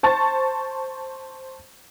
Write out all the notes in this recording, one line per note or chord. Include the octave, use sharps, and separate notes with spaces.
C5 A5 C#6 A6